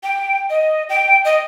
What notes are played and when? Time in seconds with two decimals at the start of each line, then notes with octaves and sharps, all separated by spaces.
0.03 G5
0.50 D#5
0.89 G5
1.25 D#5